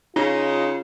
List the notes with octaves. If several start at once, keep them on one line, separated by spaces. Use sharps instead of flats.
C#3 D#4 F4